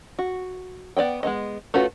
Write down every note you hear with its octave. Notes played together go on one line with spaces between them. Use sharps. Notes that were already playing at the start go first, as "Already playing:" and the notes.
F#4
B3 D5 D#5 G5
G#3 B3 C#4 D#5
A3 C#4 F4 F#4 B4